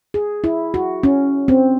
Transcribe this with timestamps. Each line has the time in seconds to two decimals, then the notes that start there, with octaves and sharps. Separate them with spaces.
0.14 G#4
0.44 E4
0.74 F#4
1.03 C#4
1.48 C4